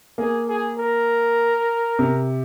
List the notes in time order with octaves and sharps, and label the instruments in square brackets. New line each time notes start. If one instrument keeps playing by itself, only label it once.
[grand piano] A#3 [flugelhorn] G#4
[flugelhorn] G#4
A#4
[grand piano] C3